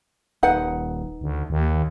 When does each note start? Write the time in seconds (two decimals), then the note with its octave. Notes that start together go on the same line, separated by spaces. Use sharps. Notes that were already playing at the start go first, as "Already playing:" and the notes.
0.43 D#1 D#4 B4 F#5
1.21 D2
1.50 D#2